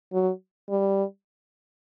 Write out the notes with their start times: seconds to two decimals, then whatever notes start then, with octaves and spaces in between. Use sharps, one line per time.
0.13 F#3
0.70 G3